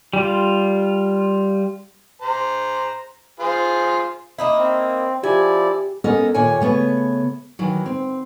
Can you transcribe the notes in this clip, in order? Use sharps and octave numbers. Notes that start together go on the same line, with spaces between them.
G3 F4
C5 A#5
F4 G#4 C5
A#3 D#4 E4
C4
F3 E4 G4 D5 G#5
B3 C#4 A4 A#4 D#5
D#2 A#2 C#5 G#5
C#3 A3 B3 C#5
D#3 E3 F#3
C4